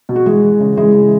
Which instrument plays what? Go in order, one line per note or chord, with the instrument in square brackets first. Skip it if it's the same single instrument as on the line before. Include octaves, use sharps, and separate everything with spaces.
[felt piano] B2
F#4
E3 G#3 G#4
E3
C#3
E3 G#3 G#4
C#3